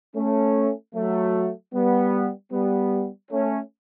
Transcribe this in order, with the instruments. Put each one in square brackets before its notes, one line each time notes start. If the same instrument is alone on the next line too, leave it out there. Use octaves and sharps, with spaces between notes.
[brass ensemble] A3 C#4
F#3 A3
G3 B3
G3 B3
A3 C#4